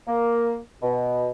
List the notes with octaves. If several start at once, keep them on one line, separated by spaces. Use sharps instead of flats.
A#3
B2